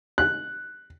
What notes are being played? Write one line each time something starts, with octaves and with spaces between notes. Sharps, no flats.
F#6